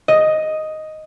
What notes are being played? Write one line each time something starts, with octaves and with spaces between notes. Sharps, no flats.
D#5